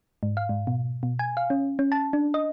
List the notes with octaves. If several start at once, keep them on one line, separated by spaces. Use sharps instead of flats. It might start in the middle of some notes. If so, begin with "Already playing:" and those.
G#2
F5
G#2
B2
B2
G#5
F5
C#4
C#4
A5
D4
D#5